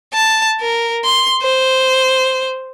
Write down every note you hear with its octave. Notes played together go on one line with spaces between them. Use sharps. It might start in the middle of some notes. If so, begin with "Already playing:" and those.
A5
A#4
C6
C5